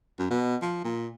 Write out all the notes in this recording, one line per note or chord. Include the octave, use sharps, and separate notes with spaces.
F#2
B2
F3
A#2